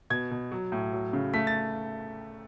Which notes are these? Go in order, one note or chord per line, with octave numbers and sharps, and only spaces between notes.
B2 G#6
B2
F#3
A2
F#3
C#3
A3 B6
A6